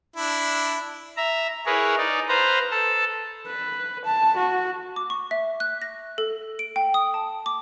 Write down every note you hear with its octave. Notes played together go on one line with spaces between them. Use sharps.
D4 E4
E5 A#5
E4 G#4 A#4 B4 C#5
D#4 D5
B4 C5 F5 A#5
A4 A5
B4
A5
F#4
D6
C#6
E5
F#6
A#6
A4
D7
G5
D#6
A5
D6